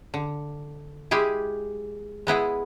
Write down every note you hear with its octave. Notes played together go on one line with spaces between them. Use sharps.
D3
G#3 E4 G4 G#4
G#3 B3 E4 G#4